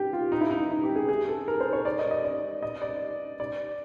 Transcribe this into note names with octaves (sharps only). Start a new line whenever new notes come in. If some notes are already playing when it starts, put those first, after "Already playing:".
Already playing: G4
F4
D#4
E4
D#4
D#4
G4
G#4
G#4
A4
A#4
C5
C#5
D5
D#5
D#5
D5
D#5
D5
D5